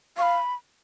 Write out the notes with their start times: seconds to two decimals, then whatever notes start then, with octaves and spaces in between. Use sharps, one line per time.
0.17 F5 C#6
0.22 B5